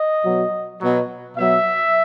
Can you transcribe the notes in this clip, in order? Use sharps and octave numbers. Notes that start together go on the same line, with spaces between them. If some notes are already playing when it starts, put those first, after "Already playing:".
Already playing: D#5
B2 F#3
B2 F#3
B2 F#3 E5